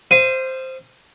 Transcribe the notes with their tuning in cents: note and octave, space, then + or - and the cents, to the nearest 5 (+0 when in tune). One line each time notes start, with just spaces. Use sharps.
C5 +0 F5 -35 D#6 +0